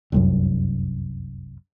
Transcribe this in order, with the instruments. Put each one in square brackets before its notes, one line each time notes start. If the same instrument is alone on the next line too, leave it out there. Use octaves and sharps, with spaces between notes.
[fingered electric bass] F1 C2 F#2